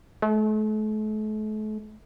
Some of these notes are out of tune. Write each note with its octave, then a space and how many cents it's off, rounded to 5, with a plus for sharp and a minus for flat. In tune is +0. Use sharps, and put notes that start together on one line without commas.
A3 -40